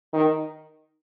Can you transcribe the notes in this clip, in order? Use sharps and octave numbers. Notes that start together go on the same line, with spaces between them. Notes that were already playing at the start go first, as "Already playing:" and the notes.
D#3